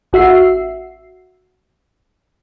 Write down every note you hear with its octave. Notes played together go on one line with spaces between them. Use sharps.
A1 F#4 E5 C7